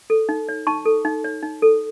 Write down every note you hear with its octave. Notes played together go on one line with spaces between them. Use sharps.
A4
D#4
C#5
D#4 A5 C#6
A4
D#4
C#5
D#4
A4